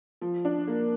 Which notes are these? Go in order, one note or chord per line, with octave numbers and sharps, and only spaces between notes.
F3
D4
A#3